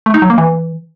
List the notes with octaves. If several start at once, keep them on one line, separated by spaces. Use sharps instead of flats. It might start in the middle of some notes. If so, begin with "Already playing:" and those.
A3
D#4
F#3
A#3
E3